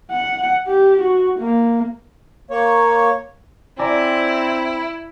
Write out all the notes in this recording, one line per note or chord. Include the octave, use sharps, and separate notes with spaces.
F#5
G4
F#4
A#3
A#3 C#5
C4 E4 D5 G#5 A#5